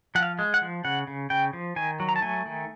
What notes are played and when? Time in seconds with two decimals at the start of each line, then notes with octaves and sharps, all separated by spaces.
0.15 F3 F#5
0.23 F5
0.39 G#3
0.54 F#5
0.62 F3
0.84 C#3 F#5
1.07 C#3
1.30 C#3 G5
1.53 F3
1.76 D#3 G#5
2.00 F#3
2.09 A#5
2.16 A5
2.22 A3 G#5
2.46 D#3